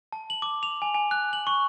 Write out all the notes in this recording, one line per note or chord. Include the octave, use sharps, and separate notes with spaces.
A5
F#7
D6
F7
G#5
G#5
F#6
F#7
C#6